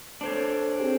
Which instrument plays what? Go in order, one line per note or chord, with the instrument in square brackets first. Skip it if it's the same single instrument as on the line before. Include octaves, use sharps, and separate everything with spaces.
[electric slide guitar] D4 C5 C#5 [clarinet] A4
[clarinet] C4 [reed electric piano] G4 G#4